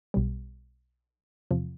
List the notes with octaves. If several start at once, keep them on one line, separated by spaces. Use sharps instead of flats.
B1 B2 G3
E2 C3 F3